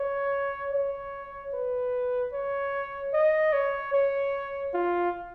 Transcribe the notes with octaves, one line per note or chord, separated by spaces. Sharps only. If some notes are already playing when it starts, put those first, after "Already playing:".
Already playing: C#5
C#5
B4
C#5
D#5
C#5
C#5
F4